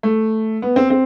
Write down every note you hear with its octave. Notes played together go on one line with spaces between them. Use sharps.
A3
B3
C4
C4